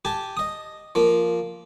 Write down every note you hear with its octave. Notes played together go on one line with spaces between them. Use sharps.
G4 G#5 A5
D#5 D#6
F3 A#3